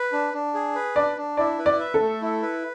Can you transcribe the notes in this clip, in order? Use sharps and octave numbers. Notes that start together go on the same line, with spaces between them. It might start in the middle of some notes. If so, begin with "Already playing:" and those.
Already playing: B4
D4
D4
G#4
B4
D4 D5
D4
E4 D5
B4
D5
E5
A4
A3
E4
B4